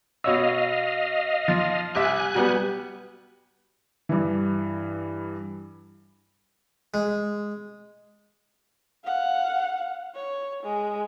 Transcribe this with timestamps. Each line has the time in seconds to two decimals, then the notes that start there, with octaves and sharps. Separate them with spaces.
0.24 B2 C#5 D#5 F5 E6
1.48 F3
1.95 C2 G4 E5 G#5 F#6
2.35 F#3 G3 B3
4.09 G2 E3
6.94 G#3
9.04 F5 F#5
10.14 C#5
10.63 G#3